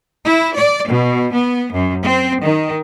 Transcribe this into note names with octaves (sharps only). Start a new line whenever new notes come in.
E4
D5
B2
B3
F#2
C4
D#3